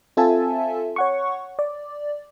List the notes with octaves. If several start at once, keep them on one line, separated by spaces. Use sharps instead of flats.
C4 F4 A4 E5 G#5 A5
C#5 F#5 C#6
D5